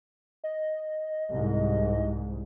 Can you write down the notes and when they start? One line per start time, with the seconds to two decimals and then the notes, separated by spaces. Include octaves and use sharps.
0.44 D#5
1.32 C2 G#2